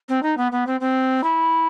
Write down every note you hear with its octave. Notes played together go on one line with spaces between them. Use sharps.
C4
D#4
B3
B3
C4
C4
E4